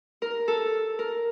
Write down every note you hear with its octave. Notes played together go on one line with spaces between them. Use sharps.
A#4
A4
A#4